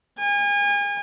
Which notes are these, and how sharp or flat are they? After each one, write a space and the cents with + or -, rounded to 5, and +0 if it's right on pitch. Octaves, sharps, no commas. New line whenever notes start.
G#5 -35